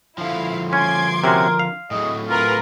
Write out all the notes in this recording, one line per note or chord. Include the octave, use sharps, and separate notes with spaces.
D3 F3 E4 F5
C#4 G#5 C6 D6 G#6
C3 C#4 F#4 A#4
F5
A2 F#3 G#4 D#5
F4 G#4 A#4 B4